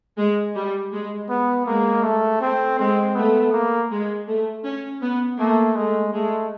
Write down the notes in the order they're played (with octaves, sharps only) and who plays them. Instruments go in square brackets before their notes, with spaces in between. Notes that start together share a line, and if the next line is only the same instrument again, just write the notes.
[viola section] G#3
G3
G#3
[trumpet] B3
[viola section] G#3 [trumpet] A#3
[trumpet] A3
[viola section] A3 [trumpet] C4
[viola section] G#3 [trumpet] C4
[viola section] A3 [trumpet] B3
[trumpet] A#3
[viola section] G#3
A3
C#4
B3
[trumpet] A3 [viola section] A#3
[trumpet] G#3 [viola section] A3
[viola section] G#3 [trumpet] A3